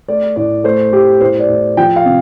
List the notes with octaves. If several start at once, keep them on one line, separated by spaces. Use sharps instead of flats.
A3 D5
A2 D5
A3 C5
A3 G4
A2 C5
D5
A2
F3 G5
F5
C3